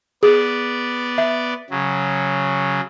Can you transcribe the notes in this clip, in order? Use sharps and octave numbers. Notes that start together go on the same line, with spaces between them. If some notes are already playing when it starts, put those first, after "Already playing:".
B3 G#4 D5
E5
C#3 F#3